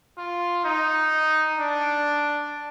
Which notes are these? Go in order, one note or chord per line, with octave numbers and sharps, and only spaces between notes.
F4
D#4
D4